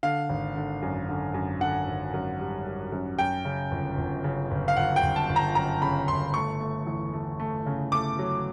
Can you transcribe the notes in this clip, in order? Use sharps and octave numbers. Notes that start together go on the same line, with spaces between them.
D3 F5
G#1
D3
F#2
D3
F#2
D3 F#5
G#1
F#2
G3
G3
F#2
F#2 G5
C#3
G1
G1
C#3
G1
F5
G1 F#5
G5
G1
A5
G1
A#5
F#2 A#5
C#3 B5
G1 C6
A3 C#6
A3
E2
A3
A3
C#3
A3 D6
F#3